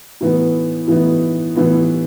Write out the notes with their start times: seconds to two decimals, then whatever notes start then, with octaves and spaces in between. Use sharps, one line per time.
0.21 A2 E3 B3 D#4
0.88 A2 E3 B3 D#4
1.55 A2 E3 B3 D#4